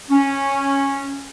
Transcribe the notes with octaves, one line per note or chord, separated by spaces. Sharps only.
C#4